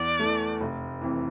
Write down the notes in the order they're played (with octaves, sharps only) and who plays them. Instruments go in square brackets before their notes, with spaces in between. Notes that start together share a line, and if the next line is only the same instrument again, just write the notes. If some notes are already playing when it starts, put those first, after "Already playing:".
Already playing: [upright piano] E2 [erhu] D5
[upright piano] E3 A3
F1
F2 E3